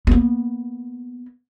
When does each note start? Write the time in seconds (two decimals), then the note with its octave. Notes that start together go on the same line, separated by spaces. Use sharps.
0.07 A#3 B3